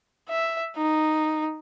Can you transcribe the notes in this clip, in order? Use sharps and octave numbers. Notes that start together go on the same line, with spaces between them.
E5
D#4